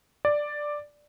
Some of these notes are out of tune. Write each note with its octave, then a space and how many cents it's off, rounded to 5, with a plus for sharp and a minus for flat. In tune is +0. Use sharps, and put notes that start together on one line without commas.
D5 +5